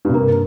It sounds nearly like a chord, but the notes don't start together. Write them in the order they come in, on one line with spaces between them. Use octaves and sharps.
G2 C3 A#3